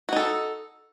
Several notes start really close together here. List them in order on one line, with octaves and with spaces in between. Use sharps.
F#4 D#4 A4